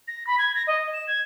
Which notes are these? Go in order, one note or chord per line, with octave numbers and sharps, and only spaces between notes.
A#6
B5
G#6
A#6
D#5
E7
G#6